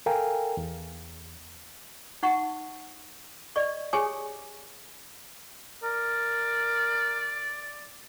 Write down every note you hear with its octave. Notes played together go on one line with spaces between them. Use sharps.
A4 A#4 F5 G5 G#5 A#5
E2
D#4 F#5 C#6
D5 D#5 C#6
G4 G#4 C#5 G#5 D#6
A#4 D5